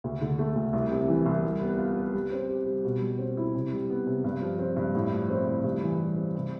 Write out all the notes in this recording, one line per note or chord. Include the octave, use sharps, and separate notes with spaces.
D2
D3
A3
D2
C2
C3
E3
C2
G3
B3
F4
B4
G3
C4
G4
G3
B2
G3
C4
E4
C3
G3
B3
C3
G2
F3
C4
G2
A2
F3
C4
A2
G2
E3
G3
C4
C3